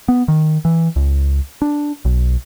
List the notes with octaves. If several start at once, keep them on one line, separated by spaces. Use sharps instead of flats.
B3
D#3
E3
C#2
D4
B1